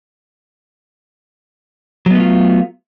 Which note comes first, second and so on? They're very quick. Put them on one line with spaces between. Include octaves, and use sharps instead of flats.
F#3 B3 A3 F4